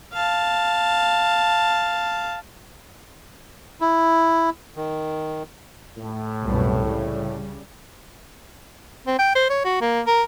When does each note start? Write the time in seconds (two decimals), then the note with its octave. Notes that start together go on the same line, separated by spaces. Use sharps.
0.13 F5 A5
3.81 E4
4.76 D#3
5.98 A2
6.44 C2 F#2 B2
6.83 C#3 G3
9.07 C4
9.19 G5
9.35 C5
9.50 C#5
9.65 F#4
9.81 A#3
10.07 A#4